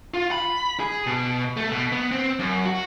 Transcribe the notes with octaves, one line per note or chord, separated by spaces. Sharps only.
F4
B5
G#4
B2
A3
B2
B3
C4
F#2
F#4